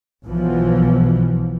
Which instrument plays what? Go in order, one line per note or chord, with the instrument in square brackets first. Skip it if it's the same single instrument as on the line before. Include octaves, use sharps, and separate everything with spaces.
[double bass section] B1 B2 E3 F3